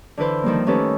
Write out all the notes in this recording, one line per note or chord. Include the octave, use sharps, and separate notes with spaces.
D3 E3 E4 B4 C5
D#3 F3 G3 A#3
D#3 A3 C#4 G4 A4 B4